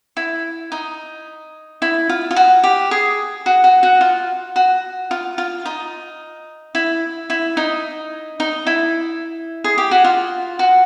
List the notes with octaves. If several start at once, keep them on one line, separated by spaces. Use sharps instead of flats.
E4
D#4
E4
F4
F4
F#4
G4
G#4
F#4
F#4
F#4
F4
F#4
F4
F4
D#4
E4
E4
D#4
D#4
E4
G#4
G4
F#4
F4
F#4